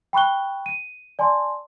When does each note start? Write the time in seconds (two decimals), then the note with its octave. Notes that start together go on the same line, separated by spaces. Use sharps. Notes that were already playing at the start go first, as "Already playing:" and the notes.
0.13 G5 B5 C#6 F#6 G7
0.66 D#7
1.19 D5 G#5 A5 C6